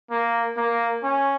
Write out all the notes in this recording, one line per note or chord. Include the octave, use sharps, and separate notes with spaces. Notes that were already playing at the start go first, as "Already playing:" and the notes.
A#3
A#3
C#4